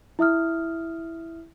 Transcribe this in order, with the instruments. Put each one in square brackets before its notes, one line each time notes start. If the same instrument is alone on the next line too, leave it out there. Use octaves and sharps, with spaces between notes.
[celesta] E4 E5 D#6 F6